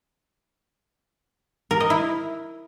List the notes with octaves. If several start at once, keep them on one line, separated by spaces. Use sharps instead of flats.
A#4
D#5
E4